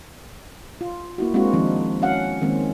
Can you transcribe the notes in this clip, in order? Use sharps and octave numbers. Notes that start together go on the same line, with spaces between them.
F4
A#3 E4 F#4
G#3 A#3 C4 D4 F4 F#4
D#3 F3 C4 D4 D#4
C#4 F#4 F5 F#5
D#3 G#3 A#3 C4 C#4